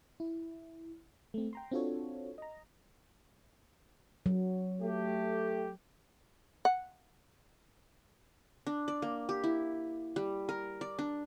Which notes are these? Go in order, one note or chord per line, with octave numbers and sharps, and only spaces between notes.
E4
A3 C4
G5 A#5 C6
C4 D4 F4 F#4 A4 C#5
D#5 A#5
F#3
A3 G4
F#5
D4
D5
A#3
G4
E4
G3
A#4
D5
D4